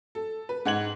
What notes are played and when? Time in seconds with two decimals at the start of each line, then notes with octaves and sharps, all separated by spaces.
0.15 A4
0.49 B4
0.65 G#2 F#5 G#6 F#7